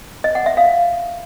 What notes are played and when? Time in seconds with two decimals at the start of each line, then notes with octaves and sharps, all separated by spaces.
0.24 D#5
0.35 F#5
0.46 E5
0.57 F5